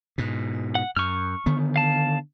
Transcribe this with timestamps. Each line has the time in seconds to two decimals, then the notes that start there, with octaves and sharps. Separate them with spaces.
0.18 G#2 B2
0.75 F#5
0.97 F#2 C#6 F6
1.46 D3 D#3 B3
1.76 F5 A5